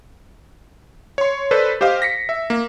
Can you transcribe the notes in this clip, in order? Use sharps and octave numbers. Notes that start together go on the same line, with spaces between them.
C#5 C6
A4 B4 C5 D5
G4 C5 D#5 F5
A#6 B6 C#7
E5
A#3